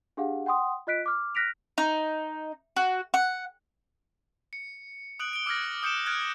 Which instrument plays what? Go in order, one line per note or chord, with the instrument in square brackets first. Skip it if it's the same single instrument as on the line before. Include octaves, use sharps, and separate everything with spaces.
[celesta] D4 G4 G#4 F5 F#5
F#5 G5 C6 D#6
F4 D#5 F#6 B6 D7
D6 F6
F6 F#6 A#6 B6 D7 F7
[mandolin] D#4
F#4
F#5
[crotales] C#7
D#6 F#6 D7 F#7
D7 G7
D6 E6 F6 G#6 A#6
D#6 G6 C#7 D7 E7 G7
F6 F#6 G#6 D7